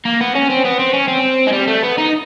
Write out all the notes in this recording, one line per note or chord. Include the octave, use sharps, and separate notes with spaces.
A#3
B3
C#4
C4
B3
C4
C#4
C4
G#3
G3
A3
B3
D#4